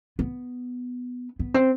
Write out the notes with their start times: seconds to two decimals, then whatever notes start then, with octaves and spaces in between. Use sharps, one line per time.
0.19 B3
1.39 B3
1.54 C4